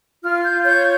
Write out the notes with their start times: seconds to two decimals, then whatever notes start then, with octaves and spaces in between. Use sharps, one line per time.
0.23 F4 F6
0.44 G6
0.65 C#5 G6